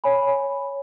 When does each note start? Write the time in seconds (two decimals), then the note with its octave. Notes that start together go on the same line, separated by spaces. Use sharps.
0.04 C#5 G#5 B5